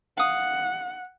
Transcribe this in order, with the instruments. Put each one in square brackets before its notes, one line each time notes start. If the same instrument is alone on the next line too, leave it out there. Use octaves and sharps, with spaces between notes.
[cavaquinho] F5 D#6 [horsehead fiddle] F#5